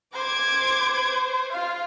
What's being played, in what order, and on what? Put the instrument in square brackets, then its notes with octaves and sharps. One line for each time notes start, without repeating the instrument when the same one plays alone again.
[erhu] C5 [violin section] D6 G#6
[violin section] F4 [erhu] F5